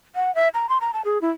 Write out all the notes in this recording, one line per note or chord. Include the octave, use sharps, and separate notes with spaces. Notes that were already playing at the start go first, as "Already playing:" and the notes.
F#5
E5
A#5
C6
A#5
A5
G#4
E4